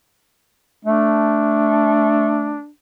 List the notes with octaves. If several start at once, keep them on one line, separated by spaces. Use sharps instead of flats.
A3 D4